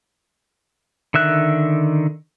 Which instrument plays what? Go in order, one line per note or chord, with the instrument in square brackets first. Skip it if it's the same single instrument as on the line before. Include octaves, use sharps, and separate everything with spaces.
[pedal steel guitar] D3 D#3 E5 F#6